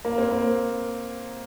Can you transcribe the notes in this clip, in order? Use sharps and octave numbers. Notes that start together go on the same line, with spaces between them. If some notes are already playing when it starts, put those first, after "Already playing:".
A#3
C4
A#3